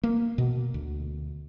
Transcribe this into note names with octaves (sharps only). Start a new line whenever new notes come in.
A#3
B2
D2